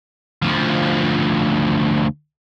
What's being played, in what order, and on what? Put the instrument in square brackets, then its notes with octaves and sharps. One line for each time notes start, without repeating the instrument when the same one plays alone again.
[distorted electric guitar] D2 F3